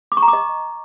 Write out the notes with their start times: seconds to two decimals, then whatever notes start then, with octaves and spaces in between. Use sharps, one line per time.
0.12 D6
0.17 C#6
0.22 A#5
0.28 D6
0.33 D#5